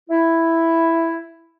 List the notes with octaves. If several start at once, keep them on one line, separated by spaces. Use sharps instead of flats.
E4